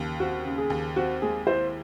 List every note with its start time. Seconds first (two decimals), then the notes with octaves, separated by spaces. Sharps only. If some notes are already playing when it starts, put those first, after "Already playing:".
Already playing: D#2 C#3
0.20 C4 F#4
0.45 C#3
0.58 G#4
0.70 D#2
0.96 C4 F#4
1.22 G#3 G#4
1.47 E4 C5